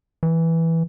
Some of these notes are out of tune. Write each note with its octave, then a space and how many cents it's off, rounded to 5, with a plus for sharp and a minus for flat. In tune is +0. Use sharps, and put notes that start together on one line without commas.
E3 -5